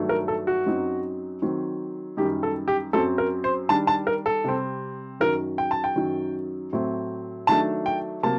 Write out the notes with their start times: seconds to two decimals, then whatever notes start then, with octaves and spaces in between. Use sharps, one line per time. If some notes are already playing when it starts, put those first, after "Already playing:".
Already playing: G2 D#3 F#3 A3 D4
0.09 A#4
0.28 A4
0.47 F#4
0.66 F#2 F#3 C4 D#4
1.42 D#3 F#3 C4
2.17 F#2 D#3 G3 G4
2.43 A4
2.68 G4
2.93 F#2 F#3 C4 A4
3.18 A#4
3.44 C5
3.69 D#3 G3 D4 A5
3.87 A5
4.07 A#4
4.26 A4
4.44 C3 G3 C4
5.20 F#2 D#3 F#3 A#4
5.58 G5
5.71 A5
5.84 G5
5.96 F#2 D#3 F#3
6.72 A2 F#3 A3 C4
7.47 D#3 F#3 A3 D4 A5
7.86 G5
8.23 C3 F#3 A#3 A5